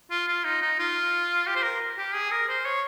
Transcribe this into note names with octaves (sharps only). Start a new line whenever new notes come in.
F4
F4
D#4
D#4
F4
G4
C5
A#4
G4
G#4
A#4
C5
C#5